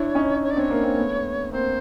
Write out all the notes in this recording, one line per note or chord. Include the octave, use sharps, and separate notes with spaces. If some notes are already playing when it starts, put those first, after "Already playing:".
Already playing: D4 E4 C#5
C#4 D#4
C#5
D5
C4 D4 C#5
A#3 C4
A#3 C4
A3 B3
A#3 C4 C5